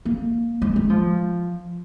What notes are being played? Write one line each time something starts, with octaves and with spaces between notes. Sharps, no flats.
A#3
G#3
G#3
F3